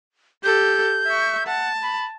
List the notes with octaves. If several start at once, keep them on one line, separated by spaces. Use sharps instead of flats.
G4 A4 G6
E5 C#6
F#5 A5
B5